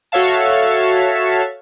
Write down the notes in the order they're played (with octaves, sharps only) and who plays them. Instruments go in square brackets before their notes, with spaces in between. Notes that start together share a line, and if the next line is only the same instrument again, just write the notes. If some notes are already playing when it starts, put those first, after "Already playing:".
[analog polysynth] F#4 A4 C#5 E5 F5 A5